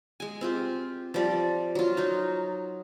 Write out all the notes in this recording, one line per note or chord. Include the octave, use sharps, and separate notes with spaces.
G#3 G#5
C4 F4 G4
F3 G3 D5
F#3 F4
F#3 D#4